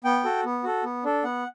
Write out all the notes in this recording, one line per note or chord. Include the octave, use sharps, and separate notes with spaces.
B3 G5
F#4 A4
B3
F#4 A4
B3
D4 A4
B3 F#5